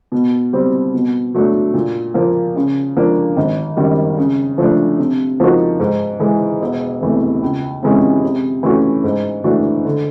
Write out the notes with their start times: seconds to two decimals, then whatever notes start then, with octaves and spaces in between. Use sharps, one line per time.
0.12 B2
0.53 G3 C4
0.94 B2
1.34 F#3 A3 D4
1.74 A#2
2.14 F3 A#3
2.56 C#3
2.97 F3 A#3 D4
3.37 G#1
3.77 F#2 D#3 G3 A#3
4.18 C#3
4.58 F3 A3 D4
4.99 C3
5.40 F3 A#3 D#4 F#4
5.80 G#2
6.20 E3 G#3
6.61 E1
7.01 E2 C3 E3 A3
7.42 C#2
7.83 C3 E3 G#3 C#4
8.23 C3
8.63 E3 A3 C#4 F#4
9.04 G#2
9.44 E3 A3 D4 F#4
9.85 D3